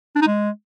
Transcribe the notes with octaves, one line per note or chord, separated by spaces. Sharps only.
D4
D#4
G#3